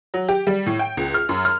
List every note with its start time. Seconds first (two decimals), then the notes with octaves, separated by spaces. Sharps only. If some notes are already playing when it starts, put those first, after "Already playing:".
0.14 F#3
0.29 G4
0.47 G3
0.66 A2
0.79 G5
0.97 C#2
1.14 F6
1.29 F#2
1.45 F6